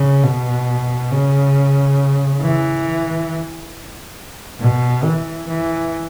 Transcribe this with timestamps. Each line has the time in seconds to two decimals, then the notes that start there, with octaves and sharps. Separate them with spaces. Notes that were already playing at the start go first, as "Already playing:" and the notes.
Already playing: C#3
0.23 B2
1.11 C#3
2.41 E3
4.60 B2
5.04 E3
5.48 E3